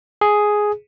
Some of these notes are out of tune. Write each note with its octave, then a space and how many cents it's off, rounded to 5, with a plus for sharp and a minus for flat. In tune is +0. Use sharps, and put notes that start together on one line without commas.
G#4 +5